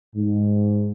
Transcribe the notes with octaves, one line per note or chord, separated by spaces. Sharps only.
G#2